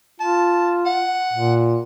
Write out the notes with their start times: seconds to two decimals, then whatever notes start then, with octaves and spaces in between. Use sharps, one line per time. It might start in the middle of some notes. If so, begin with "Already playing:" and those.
0.20 F4 A5
0.86 F#5
1.33 A#2